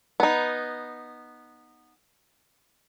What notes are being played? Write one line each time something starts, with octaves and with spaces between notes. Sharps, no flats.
B3 D#4